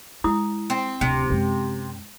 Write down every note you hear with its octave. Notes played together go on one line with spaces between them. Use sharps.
G#3 E4 D#6
C4
D1 C3 D4
F#2 G#3